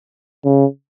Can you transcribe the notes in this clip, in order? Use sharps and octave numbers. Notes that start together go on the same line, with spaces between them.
C#3